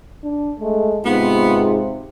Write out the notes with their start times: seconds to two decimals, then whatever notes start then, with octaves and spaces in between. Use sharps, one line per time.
0.24 D4
0.60 G#3 A3
1.05 G#2 C3 B3 F4